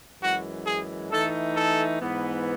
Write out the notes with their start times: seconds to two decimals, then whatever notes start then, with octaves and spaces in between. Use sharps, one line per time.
0.22 F#2 E3 G#3 F#4
0.66 G#4
1.11 E3 A3 D#4 A4
1.56 A4
2.01 G#2 E3 B3